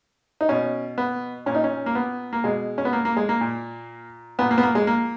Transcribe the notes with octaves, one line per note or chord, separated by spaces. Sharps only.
D#4
B2 C#4
B3
A#2 C#4
D#4
C#4
A#3
B3
A#3
B2 G#3
C#4
B3
A#3
A#3
G#3
A#3
A#2
A#2 B3
A#3
B3
A#3
G#3
A#3